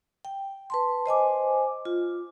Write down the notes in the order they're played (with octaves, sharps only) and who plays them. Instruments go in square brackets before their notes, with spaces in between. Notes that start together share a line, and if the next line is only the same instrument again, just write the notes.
[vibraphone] G5
B4 A5 C6
C5 D#5 G#5 D6
F4